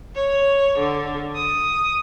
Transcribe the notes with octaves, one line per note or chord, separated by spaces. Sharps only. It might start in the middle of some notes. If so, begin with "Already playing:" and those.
C#5
D3
D#6